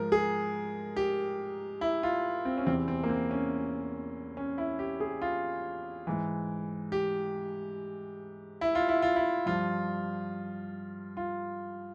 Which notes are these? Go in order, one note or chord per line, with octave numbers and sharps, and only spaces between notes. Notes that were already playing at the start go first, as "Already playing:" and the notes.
Already playing: G#2 F3 A#4
G#4
G4
E4
F4
C4
C#4
E2 C3 E3 C4
C4
A#3
C4
C#4
C#4
E4
G4
G#4
F4
G#2 E3
G4
E4
F4
E4
F4
E4
G2 F3 F4
F4